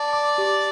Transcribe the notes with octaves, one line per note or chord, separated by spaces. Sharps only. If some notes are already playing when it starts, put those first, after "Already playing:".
Already playing: D5 A5
D6
G4